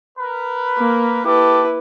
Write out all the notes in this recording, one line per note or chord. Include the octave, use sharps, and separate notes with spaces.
A#4 B4
A#3
E4 G4 A4 B4 D6